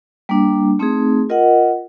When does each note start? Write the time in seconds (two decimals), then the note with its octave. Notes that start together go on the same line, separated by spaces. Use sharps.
0.29 G3 A#3 D4
0.79 A3 C4 D#4 G#4
1.29 F4 A#4 D#5 F#5